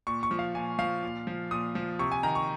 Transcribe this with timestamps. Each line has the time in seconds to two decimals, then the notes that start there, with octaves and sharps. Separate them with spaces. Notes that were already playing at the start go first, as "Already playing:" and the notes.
0.07 A#2 C#6
0.23 C#6
0.31 F3
0.39 F5
0.55 A#2 G#5
0.79 F3 F5
1.03 A#2
1.27 F3
1.51 A#2 D#6
1.75 F3
1.99 C3 C#6
2.12 G#5
2.23 D#3 A#5
2.35 C#6